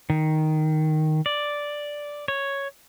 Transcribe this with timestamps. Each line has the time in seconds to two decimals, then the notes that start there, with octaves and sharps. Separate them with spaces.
0.10 D#3
1.26 D5
2.28 C#5